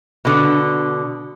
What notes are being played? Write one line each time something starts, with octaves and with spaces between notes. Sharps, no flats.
B2 D3